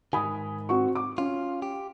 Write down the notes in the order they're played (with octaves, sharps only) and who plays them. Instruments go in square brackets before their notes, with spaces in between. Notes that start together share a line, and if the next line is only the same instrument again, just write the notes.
[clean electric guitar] G#2 D#3 [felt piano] G#5 B5 D#6
[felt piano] C4 F#4 C#6
D6
[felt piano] C#4 [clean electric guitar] F4
[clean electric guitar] G4